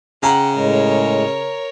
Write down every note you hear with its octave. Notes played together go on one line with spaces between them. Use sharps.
C#3 F#5 G5 A#5
A2 G#3 A#4 C#5